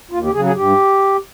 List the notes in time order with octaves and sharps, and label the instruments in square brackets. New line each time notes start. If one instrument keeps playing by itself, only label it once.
[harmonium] D#2 F4
G4
C#3 G#4
F#3
G#4
G2 G4